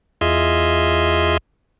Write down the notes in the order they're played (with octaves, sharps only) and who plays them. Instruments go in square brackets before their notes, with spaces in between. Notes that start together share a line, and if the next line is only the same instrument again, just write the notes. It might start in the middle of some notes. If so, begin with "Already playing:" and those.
[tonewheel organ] E2 F4 G#4 D#5 E5 C6